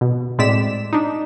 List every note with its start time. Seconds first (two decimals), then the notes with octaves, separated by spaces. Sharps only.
0.01 B2
0.38 A2 G#3 C4 D5 B6 E7
0.93 D4 D#4